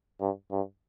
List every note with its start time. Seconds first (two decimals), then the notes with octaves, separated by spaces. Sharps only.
0.20 G2
0.51 G2